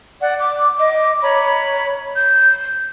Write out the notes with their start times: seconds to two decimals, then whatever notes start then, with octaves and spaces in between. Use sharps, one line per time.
0.21 D5 F#5
0.40 D6
0.77 D#5 D6
1.22 C#5 A#5 B5
2.16 G6